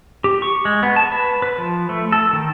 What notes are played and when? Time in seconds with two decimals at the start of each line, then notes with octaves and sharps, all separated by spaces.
0.24 G4
0.42 C#6
0.65 G#3
0.83 B3
0.96 A5
1.12 B4
1.42 B4
1.58 F3
1.89 A3
2.12 A4
2.33 D#3